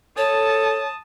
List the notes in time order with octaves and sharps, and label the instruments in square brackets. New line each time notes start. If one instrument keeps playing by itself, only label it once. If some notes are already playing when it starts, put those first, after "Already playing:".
[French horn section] A4 [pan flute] C#5 [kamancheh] A5 D#6